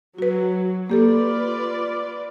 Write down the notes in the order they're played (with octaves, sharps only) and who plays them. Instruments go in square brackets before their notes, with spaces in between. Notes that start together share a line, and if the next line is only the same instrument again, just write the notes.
[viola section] F#3 [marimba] F#4 B4
[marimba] A#3 G4 A4 [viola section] F4 B4 D5